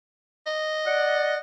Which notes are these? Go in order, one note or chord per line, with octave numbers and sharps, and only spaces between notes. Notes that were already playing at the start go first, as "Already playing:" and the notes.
D#5
D5 F#5